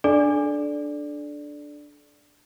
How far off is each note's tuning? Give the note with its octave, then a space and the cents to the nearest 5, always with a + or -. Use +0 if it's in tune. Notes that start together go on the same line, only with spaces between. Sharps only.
D4 +0 A4 -30 D5 +0